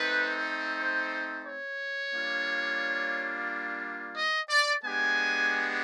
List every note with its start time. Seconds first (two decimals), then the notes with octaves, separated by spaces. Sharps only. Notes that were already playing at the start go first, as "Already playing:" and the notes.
Already playing: A3 C4 D#4 B4
0.79 C5
1.45 C#5
2.14 G3 A#3 D4 F4
4.16 D#5
4.50 D5
4.83 G#3 B3 D4 G4 G#5